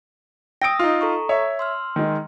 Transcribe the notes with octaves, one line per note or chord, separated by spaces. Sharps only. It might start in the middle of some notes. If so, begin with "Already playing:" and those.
G5 D#6 E6 A#6 D7
D#4 F4
A4 A#5 C#6
C#5 E5
C6 E6 F6
D#3 G#3